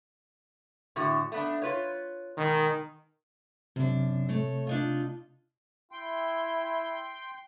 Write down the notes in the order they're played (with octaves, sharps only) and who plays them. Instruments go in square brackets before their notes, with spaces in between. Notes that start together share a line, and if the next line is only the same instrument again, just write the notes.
[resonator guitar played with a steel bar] A2 D3 F#4
A3 B3 D4
F4 B4 C#5
[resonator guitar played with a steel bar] B2 G#3 [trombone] D#3
[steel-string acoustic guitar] F#2 D4 [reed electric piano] C3
[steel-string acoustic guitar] A3 C#5
D4 D#4 F4
[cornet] E4 [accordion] G5 C6